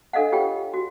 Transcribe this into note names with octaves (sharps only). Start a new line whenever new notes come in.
D4 A4 D#5 F5 F#5
F4 G4 C#5 G5
F#4